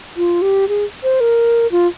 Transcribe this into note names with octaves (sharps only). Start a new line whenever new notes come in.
F4
G4
G#4
C5
A#4
F4